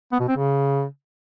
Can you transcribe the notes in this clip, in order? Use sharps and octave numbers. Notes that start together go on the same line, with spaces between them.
B3
B2
C4
C#3